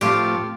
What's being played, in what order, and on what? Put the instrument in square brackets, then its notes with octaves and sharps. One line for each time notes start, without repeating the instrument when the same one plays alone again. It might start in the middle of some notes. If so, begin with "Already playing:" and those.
[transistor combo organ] A2 F3 A3 C4 [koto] F4 G4